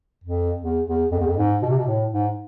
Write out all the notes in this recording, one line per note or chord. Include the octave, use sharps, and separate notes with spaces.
F2
E2
E2
F2
E2
F2
G#2
B2
C3
B2
A2
G#2